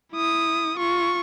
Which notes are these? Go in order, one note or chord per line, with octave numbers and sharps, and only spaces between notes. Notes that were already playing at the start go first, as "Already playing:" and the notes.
E4 D#6
F4 C#6